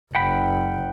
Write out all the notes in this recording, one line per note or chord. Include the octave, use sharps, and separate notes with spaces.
F#1 F#5 G5 B5